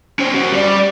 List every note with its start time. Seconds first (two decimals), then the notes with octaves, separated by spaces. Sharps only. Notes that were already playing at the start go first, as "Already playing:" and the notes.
0.19 C#4 C5
0.34 C#4 F#4
0.52 G3 D5